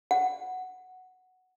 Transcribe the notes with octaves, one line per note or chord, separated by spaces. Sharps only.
F#5